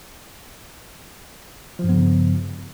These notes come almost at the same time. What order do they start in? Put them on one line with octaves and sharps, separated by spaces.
F3 G2 B3 C#3